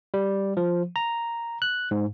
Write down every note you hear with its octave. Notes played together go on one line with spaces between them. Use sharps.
G3
F3
A#5
F#6
G#2